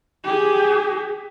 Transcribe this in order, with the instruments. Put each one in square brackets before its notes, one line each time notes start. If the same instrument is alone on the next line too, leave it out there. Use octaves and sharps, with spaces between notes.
[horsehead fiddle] G4 G#4